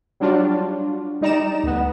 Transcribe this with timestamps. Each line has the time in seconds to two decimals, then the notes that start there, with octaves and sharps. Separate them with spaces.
0.20 F#3 G3 D4 F4 F#4
1.21 G3 D#4 D5 A#5 E7
1.64 D2 B3